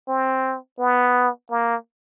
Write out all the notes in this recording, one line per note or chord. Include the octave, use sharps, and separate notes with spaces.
C4
B3
A#3